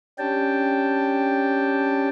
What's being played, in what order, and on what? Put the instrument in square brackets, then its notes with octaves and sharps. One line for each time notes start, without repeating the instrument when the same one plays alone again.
[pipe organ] C#4 D4 G4 G5 A5